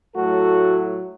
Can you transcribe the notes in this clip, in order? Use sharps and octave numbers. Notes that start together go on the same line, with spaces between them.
A2 F#3 A3 F#4 A4